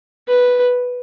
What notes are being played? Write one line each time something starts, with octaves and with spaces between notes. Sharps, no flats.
B4